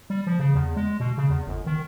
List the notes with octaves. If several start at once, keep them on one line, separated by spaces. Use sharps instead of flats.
G3
F3
C#3
E2
G#3
B2
C#3
E2
G1
D#3